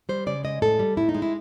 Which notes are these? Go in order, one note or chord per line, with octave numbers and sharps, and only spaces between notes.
G3 C5
C#3 D5
G#3 D#5
A2 A4
G3
A2 E4
D#4
G#3
E4